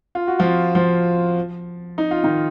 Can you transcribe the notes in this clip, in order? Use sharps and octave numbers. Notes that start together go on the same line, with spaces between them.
F4
F#4
F3 F4
F3 F4
D#4
F4
D#3 D#4